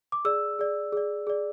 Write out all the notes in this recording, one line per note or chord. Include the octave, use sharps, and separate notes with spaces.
D6
G#4 D5 E6
G#4 D5
G#4 D5
G#4 D5